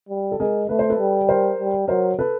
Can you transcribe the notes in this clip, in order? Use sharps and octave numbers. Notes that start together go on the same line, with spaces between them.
G3
A4
G#3 G#4 A#4
A3 B4
C5
A4 B4
G3
A#4 C5
G3
F#3 A#4 C5
A4 B4